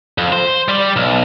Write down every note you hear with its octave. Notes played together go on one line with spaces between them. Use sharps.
F2
C5
G3 D5
B1